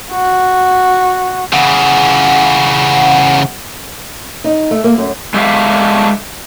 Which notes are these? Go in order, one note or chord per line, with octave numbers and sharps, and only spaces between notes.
F#4
C#3 E3 F#5
D#4
A3
A#3
F#2
G#3 A3 D4 G4 E5 F5